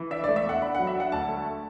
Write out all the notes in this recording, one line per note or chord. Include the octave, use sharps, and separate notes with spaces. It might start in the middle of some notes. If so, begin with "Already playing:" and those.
Already playing: E3
D4 E5
D5
A3
E5
E2 F#5
D4 B5
F#5
F#3
E5
D4 F#5
D2 A5
A3